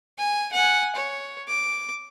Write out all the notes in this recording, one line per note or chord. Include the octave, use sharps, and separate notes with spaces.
G#5
F#5 G#5
C#5
D6